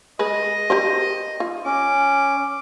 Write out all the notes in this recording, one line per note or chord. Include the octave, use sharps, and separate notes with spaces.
G#3 G#4 B4 D#5
G4 A#4 C5
F4
C#4 D6